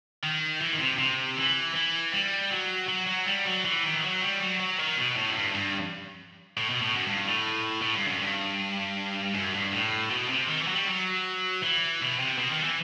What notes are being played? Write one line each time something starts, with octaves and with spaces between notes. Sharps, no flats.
D#3
E3
D#3
C3
C3
E3
E3
G3
F#3
F#3
F#3
G3
F#3
E3
D#3
E3
F#3
G3
F#3
F#3
D#3
B2
A2
F#2
G2
G2
A2
B2
A2
F#2
G2
A2
A2
G2
F#2
G2
F#2
G2
A2
B2
C3
D#3
E3
F#3
G3
F#3
E3
B2
C3
B2
D#3
E3